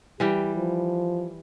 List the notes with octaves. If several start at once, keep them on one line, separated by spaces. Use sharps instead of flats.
E3 G3 G4 G5
F3